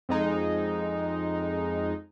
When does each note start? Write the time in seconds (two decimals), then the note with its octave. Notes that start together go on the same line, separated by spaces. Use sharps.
0.09 F2 G#3 D#4